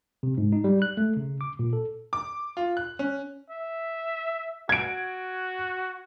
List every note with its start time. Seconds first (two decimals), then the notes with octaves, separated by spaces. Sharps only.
0.23 C3
0.37 G#2
0.52 D#4
0.64 G3
0.82 F#6
0.97 A3
1.16 C#3
1.41 D6
1.59 A#2
1.73 A4
2.13 D6
2.57 F4
2.77 F#6
2.99 C#4
3.50 E5
4.69 F#4 G#6 D7